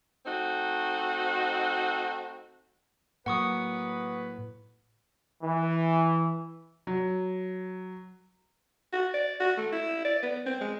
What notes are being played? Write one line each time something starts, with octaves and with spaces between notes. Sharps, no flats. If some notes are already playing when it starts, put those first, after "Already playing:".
A3 C4 D#4 F#4
A2 F#3 A#3 B4 F#5 C#6 D#6
E3
F#3
F#4
D5
F#4
A3
E4
D5
B3
C4
G#3